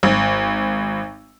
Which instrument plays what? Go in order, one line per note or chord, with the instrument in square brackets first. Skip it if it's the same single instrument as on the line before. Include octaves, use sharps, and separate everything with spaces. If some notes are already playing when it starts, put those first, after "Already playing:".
[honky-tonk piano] G#1